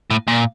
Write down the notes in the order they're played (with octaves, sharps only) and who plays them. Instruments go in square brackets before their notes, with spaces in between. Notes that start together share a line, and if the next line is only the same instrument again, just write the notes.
[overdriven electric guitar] A2
A#2